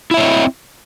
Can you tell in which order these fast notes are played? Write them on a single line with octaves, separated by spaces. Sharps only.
E4 E5 C#5 D#5 C4